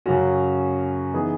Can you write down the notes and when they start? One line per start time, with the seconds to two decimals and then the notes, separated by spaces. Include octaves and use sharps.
0.06 F#2 C#3 F#3 C#4 F#4
1.13 E3 B3 D#4 G#4